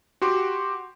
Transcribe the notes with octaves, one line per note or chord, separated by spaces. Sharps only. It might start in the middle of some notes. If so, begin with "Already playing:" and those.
F#4 G4 C6 D6